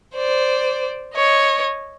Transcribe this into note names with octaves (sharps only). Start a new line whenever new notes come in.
C5 D5
C#5 D#5